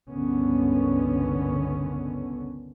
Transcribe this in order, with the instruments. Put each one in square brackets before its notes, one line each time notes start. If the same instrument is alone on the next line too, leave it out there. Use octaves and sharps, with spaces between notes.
[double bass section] G1 C#2 D3 D#3 B3 C#4